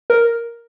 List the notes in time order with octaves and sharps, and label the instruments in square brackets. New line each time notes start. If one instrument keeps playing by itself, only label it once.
[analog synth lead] A#4